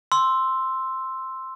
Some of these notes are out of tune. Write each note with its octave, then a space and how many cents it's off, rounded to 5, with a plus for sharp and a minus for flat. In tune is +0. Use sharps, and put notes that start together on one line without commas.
C6 +0 E6 +0